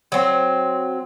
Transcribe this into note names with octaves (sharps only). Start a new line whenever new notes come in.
F#3 C4